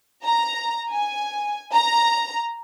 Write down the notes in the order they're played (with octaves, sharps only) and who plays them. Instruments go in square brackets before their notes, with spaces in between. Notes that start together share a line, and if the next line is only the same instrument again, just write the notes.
[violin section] A#5
G#5
A#5